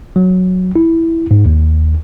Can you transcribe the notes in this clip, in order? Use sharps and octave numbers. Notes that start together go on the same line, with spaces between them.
F#3
E4
G#2
D#2